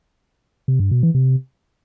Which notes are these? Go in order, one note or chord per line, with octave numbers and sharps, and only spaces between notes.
C3
G2
B2
E3
C3